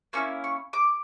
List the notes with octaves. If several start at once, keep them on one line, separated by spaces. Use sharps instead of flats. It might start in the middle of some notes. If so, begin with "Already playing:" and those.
A#3 C#4 E4 C#6
C#6
D6